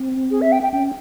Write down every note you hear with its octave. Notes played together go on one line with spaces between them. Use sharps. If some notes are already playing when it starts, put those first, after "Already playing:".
Already playing: C4
G#4
E5
G5
G5
C#4 G5